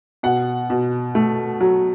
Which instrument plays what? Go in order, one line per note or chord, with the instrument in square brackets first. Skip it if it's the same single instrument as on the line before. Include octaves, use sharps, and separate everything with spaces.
[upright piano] B2 F#5
B2
A3
F#3